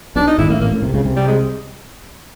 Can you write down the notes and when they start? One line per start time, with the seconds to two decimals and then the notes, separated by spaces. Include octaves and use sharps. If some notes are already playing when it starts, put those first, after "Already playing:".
0.16 B1 B2 D4
0.27 D#4
0.38 G#1 G#2 E4
0.48 A1 A2 A#3
0.60 A1 A2 A#3
0.72 A1 A2
0.82 C2 C3
0.94 C#2 C#3
1.04 C2 C3
1.16 G3
1.28 G#3